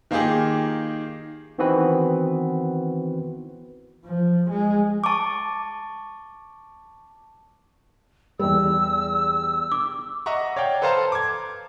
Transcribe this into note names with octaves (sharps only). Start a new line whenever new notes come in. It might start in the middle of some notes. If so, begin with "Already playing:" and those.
D#3 A#3 F4 G4 G#4
D#3 E3 B3 C4 F#4 B4
F3
G#3
A5 C#6 D6
E2 G3 E6
D6
D#5 E5 F#5 A#5 C#6
C#5 D5 F5 G5
A4 B4 C5 F5 A5 A#5
D6 G#6